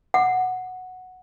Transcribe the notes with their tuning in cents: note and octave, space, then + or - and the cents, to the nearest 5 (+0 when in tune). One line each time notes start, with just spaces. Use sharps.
F#5 -5